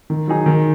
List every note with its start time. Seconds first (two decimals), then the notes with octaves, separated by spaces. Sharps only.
0.10 D#3
0.28 F#3 D#4 G#4
0.46 D#3